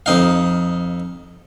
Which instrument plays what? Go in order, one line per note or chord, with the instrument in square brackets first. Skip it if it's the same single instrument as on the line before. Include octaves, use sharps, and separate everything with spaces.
[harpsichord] F2 D#4 F5